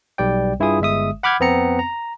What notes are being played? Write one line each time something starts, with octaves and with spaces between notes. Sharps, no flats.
B1 G3 D5 G5
G2 E4 F4 G#4 D#6
G1 G#3 E5 D#6
F#5 B5 D6 F6 G6 G#6
F2 B3 C4 A#5 C#7
A#5